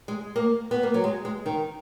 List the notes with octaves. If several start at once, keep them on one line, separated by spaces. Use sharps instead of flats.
G#3
A#3
B3
A#3
F#3
G#3
G#3
D#3